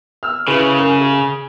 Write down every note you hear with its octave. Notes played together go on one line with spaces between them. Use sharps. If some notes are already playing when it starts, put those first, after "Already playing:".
E6 F6
C#3 E4 G#4 B4
F#2 A#4
G#4